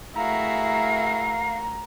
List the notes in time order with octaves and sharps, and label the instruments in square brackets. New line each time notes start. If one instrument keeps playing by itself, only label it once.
[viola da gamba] A3 F#4 A#4 [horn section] E4 G#4 E5 [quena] F5 [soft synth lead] A#5